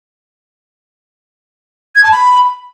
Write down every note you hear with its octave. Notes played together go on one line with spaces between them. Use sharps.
G#6
A5
B5